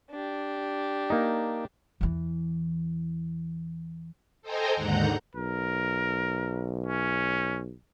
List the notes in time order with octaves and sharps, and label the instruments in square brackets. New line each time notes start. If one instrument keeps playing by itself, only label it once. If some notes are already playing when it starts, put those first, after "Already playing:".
[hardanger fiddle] D4 G4
[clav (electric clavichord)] A#3 D#4
[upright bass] E2 E3
[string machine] A4 C5 D#5 G5 G#5 A#5
D#2 G#2 D3 F#5 A#5 G6
[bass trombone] B1 [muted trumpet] A#4
[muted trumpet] C#4